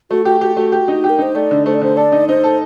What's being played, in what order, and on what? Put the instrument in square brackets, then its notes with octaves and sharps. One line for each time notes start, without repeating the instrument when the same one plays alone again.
[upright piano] A3 [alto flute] F#4
[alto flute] F#4 [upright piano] G4
[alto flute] F#4 [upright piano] G4
[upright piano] A3 [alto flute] F#4
[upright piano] G4
D#4
G4
[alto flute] A#4
[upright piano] D#4 [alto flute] C5
[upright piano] A3 [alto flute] D5
[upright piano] D3
[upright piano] A3 [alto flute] C5
[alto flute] D5
[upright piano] D3 [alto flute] C5
[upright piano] A4 [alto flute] D5
[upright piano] D#4
[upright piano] D#4 [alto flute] C5
[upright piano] A4